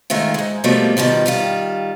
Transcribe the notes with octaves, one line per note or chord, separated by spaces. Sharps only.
D#3 G#3 A3 F4
G#2 G#3
B2 F3 G3 A3 A#3
B2 D#3 F3 G3
D#3 G3 F4